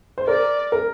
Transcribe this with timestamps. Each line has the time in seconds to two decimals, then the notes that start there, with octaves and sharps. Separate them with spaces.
0.18 C5
0.27 A#4 D5
0.72 A#4